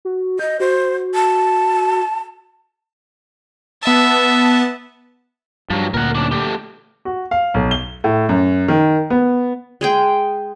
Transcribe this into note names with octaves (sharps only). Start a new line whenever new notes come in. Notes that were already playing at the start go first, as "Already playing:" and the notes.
F#4
D#5 G6
F#4 C5
A5
B3 E5 A5
G2 F3 F#3
D2 A#2 A#4 F#5
C#4 D4
A3 G4
F#4
F5
B1
G7
A2
F#2
D#3
B3
G#3 G#4 G5